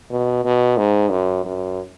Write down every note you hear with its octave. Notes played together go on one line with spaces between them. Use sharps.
B2
B2
G#2
F#2
F#2